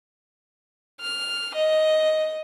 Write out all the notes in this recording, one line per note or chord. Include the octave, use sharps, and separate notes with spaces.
F6
D#5